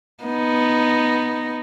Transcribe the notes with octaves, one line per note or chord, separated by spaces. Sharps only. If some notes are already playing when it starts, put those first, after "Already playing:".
B3 D#4